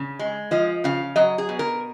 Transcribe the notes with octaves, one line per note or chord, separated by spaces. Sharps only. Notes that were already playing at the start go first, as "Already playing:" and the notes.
Already playing: C#3
G#3
F3 D#5
C#3 F5
F#3 D#5
G#4
B2
A#4